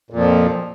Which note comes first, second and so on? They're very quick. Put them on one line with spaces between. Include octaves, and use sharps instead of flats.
A#2 F2 F3